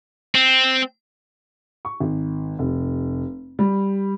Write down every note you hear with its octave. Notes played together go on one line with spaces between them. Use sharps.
C4
C#6
G#1
F1
G3